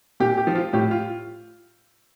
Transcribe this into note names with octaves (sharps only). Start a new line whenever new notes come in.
A#2 G4
G4
F3
F4
A2 G4
F4